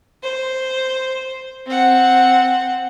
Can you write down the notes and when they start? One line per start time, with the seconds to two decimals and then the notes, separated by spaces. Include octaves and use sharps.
0.23 C5
1.67 C4 F#5